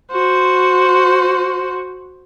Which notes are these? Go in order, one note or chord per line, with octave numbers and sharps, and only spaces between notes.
F#4 C5